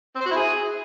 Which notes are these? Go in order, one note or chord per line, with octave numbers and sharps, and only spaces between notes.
C4
C5
F#4
E4
G#4